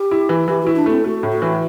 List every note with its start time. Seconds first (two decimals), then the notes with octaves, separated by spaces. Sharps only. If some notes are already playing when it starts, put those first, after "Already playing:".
Already playing: G4
0.11 E4
0.29 E3
0.48 E3 G4
0.62 E4 F#4
0.76 D4
0.86 A3 C4
1.04 A3 F#4
1.23 A2
1.32 F#4
1.42 E3